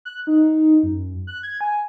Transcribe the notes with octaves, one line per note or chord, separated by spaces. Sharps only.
F#6
D#4
F#2
F#6
G#6
G#5